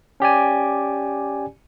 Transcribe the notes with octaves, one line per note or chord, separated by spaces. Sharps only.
C#4 G4 D5 G#5